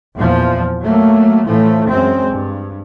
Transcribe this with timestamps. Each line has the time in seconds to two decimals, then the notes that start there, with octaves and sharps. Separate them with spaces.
0.16 E2 A#2 F3
0.82 F#3 A3 A#3
1.47 A2 E3 F3 A3
1.90 F#2 G#3 C4
2.31 G2